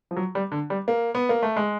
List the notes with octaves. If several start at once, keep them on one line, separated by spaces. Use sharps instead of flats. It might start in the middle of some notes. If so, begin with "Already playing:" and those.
F3
F#3
G3
D3
G3
A#3
B3
A#3
A3
G#3